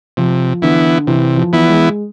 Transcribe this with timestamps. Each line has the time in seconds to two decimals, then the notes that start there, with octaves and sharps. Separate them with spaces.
0.17 C3 F3
0.62 D3 E3 B3 E4
1.07 C3 E3
1.37 F3
1.53 E3 B3 E4
1.68 G#3